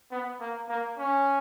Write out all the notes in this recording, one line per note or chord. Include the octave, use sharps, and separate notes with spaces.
B3
A#3
A#3
C#4